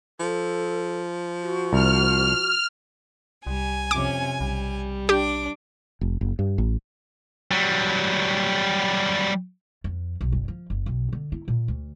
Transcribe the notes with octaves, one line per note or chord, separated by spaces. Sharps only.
F3 A4
F#4
C2 F6
C2 G3 G#5
F2 C3 C#4 D6
B1 G3
D4 G4 D6
F1
F#1
G2
A1
F#3 G3
F2
B1
F#1
F3
F#1
B1
D3
E4
A#2
D2